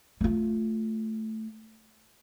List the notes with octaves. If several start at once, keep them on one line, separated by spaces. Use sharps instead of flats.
A3 F4